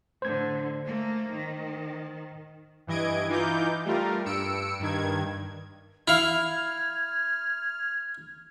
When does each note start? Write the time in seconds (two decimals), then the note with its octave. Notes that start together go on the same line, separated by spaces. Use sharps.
0.22 A2 D3 C5 G#6
0.85 A3 A#3
1.32 D#3
2.87 G2 E3 D#5 G#6 D7
3.29 E3 D#4 F4 D6 G6
3.85 G3 A3 F4 A#4
4.26 G2 E6 C#7 D7
4.80 G2 D#3 G#6
6.08 E4 F5 F6 G#6